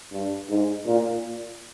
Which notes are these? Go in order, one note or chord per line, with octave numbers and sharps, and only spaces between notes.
G2
G#2
A#2